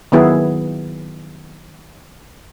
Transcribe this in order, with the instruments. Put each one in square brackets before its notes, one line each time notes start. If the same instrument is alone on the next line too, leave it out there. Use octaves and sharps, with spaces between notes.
[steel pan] D#3 F#3 B3 E4 G#4